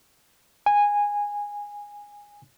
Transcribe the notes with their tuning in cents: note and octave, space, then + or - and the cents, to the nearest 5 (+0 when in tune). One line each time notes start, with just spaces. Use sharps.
G#5 -15